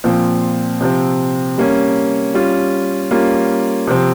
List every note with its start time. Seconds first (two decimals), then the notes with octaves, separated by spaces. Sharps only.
0.04 A#2 F3 C4
0.81 C3 F3 C4
1.58 G3 A#3 C#4
2.34 G3 C#4 F4
3.11 G3 A#3 C#4 F4
3.87 C3 F3 C4